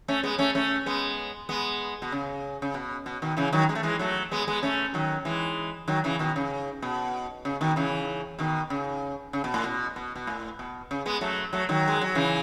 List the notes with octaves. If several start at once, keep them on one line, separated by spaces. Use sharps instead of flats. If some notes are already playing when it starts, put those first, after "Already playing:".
A3 C#4
G#3 B3
A3 C#4
A3 C#4
G#3 B3
G#3 B3
B2
C#3
C#3
B2
B2
B2 D#3
C#3 E3
D#3 F#3
G#3
A3
E3 G#3
F#3 A3
G#3 B3
G#3 B3
A3 C#4
D#3 F#3
E3 G#3
D#3 F#3
C#3 E3
B2 D#3
C#3
B2
C#3
B2 D#3
C#3 E3
B2 D#3
C#3
C#3
B2
A2
B2
B2
B2
A2
B2
C#3
G#3 B3
F#3 A3
F#3 A3
D#3 F#3
G#3
F#3
C#3 E3